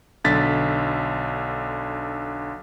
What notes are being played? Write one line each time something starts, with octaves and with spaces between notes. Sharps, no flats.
B1 D3 A6 B6